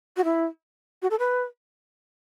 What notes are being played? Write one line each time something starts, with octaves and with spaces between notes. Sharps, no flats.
F#4
E4
F#4
A4
B4